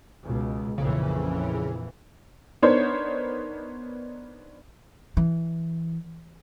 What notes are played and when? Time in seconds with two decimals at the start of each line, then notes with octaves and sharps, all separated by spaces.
0.24 C#2 B2
0.78 A#1 F2 C#3 E3
2.62 B3 D4 D#4 A#4 C5 C#5
5.17 E3